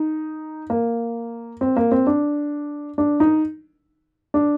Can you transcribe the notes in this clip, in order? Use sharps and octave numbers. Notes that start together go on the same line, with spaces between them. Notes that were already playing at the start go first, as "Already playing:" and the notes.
Already playing: D#4
A#3
C4
A#3
C4
D4
D4
D#4
D4